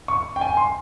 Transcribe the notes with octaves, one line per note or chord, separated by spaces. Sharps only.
C#6
G5
G#5
C6